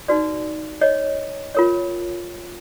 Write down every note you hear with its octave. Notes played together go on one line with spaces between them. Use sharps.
D#4 F#4 B4 D5
C#5 D#5
F4 A#4 C#5